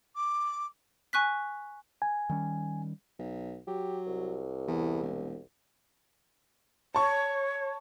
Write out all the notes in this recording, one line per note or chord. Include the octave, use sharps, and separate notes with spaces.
D6
G#5 C#6 F#6 B6
G#5
D#3 G3 C#4
B1
F#3 G4
C2
E2
E1
C#5 A5 C#6